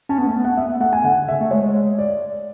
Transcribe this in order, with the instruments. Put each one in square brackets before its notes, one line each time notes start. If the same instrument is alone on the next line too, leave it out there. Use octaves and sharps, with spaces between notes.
[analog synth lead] C#4 [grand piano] A5
[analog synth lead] B3
[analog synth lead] A3 [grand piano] A5
[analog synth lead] B3
[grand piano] F#5
[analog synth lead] B3 [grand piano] E5
[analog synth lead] A3 [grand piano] F#5
[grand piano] G#5
[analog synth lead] D3 [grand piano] F#5
[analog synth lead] C#3 [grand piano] E5
[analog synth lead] A3
[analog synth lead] G#3 [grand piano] C#5
[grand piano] D5